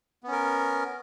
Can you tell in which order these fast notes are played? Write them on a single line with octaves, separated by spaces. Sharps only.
B3 C#4 A#4